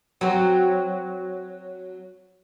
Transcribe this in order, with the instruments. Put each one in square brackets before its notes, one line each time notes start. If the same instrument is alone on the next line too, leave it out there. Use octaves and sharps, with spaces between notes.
[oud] F#3 C4